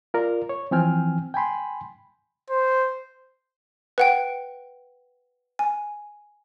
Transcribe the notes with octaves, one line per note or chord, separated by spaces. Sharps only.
F4 A#4 D5
C#5
E3 F3 C4 G5 G#5 F6
G5 G#5 B5 C6
C5
B4 F#5 G5
G#5